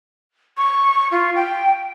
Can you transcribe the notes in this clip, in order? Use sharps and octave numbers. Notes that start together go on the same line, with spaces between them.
C#6
F4
G5